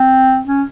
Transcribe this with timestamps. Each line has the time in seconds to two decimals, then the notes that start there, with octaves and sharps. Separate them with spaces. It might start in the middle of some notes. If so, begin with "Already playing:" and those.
Already playing: C4
0.47 C#4